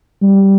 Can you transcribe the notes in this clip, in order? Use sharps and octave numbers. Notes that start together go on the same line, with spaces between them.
G3